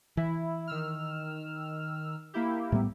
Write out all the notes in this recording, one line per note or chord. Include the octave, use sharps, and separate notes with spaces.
E3 E4
D#3 E6 F6
A#3 E4 G4
A2 G3 B3